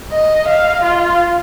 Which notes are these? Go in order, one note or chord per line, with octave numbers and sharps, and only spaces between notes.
D#5
F5
F4